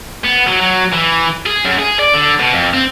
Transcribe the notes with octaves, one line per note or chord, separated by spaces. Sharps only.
B3
F#3
F#3
E3
G#4
F#2
G#4
D5
D3
B2
F2
C4